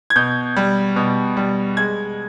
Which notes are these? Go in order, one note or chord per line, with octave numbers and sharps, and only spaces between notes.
G#6
B2 G6
G3
B2
G3
G#3 G#6